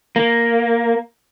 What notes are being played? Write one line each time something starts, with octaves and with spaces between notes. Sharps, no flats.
A#3